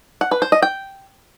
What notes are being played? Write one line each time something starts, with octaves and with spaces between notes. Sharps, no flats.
F#5
B4
C5
D#5
G5